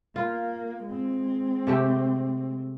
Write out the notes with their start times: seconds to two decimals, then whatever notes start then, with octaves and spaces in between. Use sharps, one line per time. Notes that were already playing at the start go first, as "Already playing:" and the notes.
0.16 A#3 F4
0.86 G#3 C4
1.67 C3 A3 G4